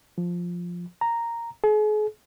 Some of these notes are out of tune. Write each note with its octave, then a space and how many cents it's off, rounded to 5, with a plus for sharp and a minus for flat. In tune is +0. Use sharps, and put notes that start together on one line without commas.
F3 +5
A#5 -5
G#4 +40